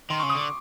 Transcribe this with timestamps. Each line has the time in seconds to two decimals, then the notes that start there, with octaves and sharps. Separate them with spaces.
0.10 D#3 C6
0.20 C#3 C#6
0.29 D#6
0.35 D3 D6